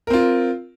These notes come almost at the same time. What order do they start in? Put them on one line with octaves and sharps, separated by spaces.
A#4 C4 F4